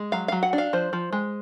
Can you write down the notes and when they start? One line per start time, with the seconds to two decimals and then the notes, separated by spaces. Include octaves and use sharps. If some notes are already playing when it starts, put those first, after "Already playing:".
Already playing: G#3
0.12 F#3 F5
0.28 F#3 F5
0.43 F#5
0.53 D4
0.58 F5
0.73 F3 C5
0.93 F3
1.13 G#3